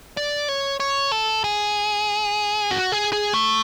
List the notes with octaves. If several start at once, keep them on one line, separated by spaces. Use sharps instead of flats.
D5
C#5
C#5
A4
G#4
F#4
G#4
G#4
A3